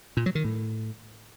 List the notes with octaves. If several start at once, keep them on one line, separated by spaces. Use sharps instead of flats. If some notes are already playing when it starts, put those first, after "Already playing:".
A#2
F#3
D#3
A2